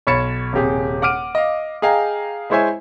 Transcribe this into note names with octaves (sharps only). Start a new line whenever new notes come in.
B1 C#5 B5 A6 C#7 E7
D#1 C3 G4 G#4
F#5 D6 F6 D7 D#7
D#5 F5
G#4 D#5 F5 G5 G#5 A#5
G#3 E4 C5 C#5 E5 G#5